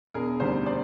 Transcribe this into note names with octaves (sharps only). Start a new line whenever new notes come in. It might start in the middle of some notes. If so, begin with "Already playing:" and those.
E1 G#4 A#4
D2 C3 D#3 G3 A#4 C5
C5 D5